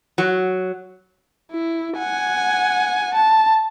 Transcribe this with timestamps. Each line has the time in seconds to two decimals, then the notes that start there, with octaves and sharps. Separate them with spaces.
0.18 F#3
1.51 E4
1.98 F#5 G#5
3.15 A5